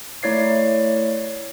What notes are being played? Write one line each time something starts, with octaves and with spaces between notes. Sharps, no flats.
A3 E4 C#5 D5 C7